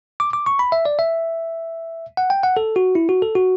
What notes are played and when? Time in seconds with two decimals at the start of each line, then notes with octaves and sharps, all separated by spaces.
0.20 D6
0.33 D6
0.46 C#6
0.59 B5
0.72 E5
0.85 D5
0.99 E5
2.17 F#5
2.30 G5
2.43 F#5
2.57 A4
2.76 F#4
2.95 E4
3.09 F#4
3.22 A4
3.35 F#4